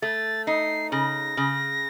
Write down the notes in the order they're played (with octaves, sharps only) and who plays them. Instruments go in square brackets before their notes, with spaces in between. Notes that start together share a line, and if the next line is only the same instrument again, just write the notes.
[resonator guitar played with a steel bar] A3 [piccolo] A6
[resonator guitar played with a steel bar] D#4 [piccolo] C7
[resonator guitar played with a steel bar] C#3 [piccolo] A#6
[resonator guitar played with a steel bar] C#3